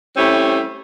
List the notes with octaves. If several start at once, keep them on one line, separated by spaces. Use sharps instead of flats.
G3 A3 C4 C#4 E4